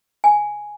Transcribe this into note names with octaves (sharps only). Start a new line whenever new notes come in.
G#5